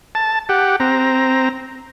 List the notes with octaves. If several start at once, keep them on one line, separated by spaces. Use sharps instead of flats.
A5
G4 F#5
C4 A#5